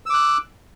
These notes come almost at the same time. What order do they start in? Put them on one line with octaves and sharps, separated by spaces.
E6 D6 F#6